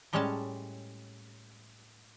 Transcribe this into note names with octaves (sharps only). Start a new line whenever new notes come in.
A2 G3 G#3 C#4 C#5 A5